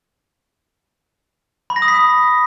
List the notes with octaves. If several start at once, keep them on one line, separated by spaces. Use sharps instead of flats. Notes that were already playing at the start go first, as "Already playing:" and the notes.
B5
A#6
D#6
B6
D#6